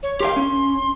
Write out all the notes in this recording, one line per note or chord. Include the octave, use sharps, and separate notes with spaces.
C#5
G4 A#4 F5 C6
C#4